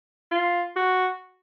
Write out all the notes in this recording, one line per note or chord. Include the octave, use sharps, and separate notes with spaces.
F4
F#4